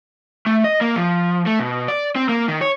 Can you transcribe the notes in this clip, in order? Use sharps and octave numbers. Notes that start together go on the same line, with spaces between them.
A3
D#5
A#3
F3
A3
B2
D5
C4
A#3
D#3
C#5